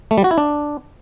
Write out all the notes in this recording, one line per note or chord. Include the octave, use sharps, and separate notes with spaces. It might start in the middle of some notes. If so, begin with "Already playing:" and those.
A3
G3
F#4
E4
D4